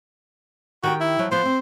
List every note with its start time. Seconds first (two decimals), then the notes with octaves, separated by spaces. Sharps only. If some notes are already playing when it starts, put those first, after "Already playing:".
0.83 D#3 F#4 G4 G5
1.00 E4
1.19 F3 F#3
1.31 F3 B3 C5
1.45 C4